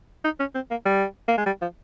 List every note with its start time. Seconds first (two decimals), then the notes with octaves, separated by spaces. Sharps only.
0.25 D#4
0.40 C#4
0.55 C4
0.71 A#3
0.86 G3
1.28 A#3
1.38 G#3
1.46 G3
1.62 F3